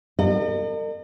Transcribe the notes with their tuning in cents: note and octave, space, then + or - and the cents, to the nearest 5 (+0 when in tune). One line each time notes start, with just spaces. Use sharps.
A#4 -45 D#5 -45